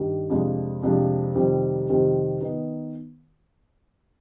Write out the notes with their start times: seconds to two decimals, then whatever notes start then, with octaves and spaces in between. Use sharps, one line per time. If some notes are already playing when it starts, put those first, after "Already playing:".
Already playing: G2 D#3 G3
0.30 F2 C3 F3 G#3 D4
0.83 F2 C3 F3 G#3 D4
1.35 F2 C3 D#3 G3 C4
1.88 F2 C3 D#3 G3 C4
2.41 D#3 B3 D#4